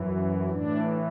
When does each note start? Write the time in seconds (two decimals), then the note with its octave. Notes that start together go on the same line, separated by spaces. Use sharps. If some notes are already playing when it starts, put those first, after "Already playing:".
Already playing: F#2 E3
0.50 A2 E3 D4